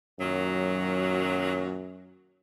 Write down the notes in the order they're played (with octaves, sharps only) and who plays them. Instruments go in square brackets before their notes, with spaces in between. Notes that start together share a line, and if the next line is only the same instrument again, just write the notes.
[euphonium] F#2 [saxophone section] A#2 D#3 F#3